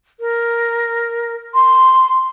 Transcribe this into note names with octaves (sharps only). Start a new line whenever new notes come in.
A#4
C6